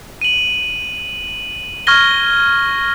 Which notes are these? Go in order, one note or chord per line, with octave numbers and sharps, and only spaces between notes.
D#7 F#7
C#6 F6 G#6 A#6 G7